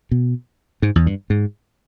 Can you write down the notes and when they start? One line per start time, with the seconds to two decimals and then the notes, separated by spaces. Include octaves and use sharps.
0.11 B2
0.82 G#2
0.96 E2
1.06 G2
1.30 G#2